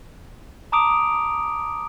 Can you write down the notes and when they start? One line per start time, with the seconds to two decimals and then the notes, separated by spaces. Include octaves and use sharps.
0.72 A5 A#5 D6 D#6 D7 F7